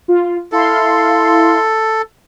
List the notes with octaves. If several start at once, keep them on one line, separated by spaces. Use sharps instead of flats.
F4
E4 A4 F5 C6